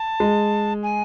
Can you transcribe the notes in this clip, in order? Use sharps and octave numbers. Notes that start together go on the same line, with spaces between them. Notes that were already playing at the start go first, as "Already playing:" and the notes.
Already playing: A5
G#3
G#5